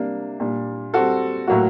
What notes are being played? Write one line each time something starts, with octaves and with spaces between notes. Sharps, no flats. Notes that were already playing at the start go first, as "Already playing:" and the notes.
Already playing: C3 G3 A#3 D4
A#2 G3 D4
G3 C4 F#4 A4
A2 F#3 A#3 F#4